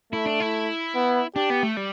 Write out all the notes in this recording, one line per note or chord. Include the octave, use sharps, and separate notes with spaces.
A3 E4
D4
E4
B3
D4 G4
B3
A3
G3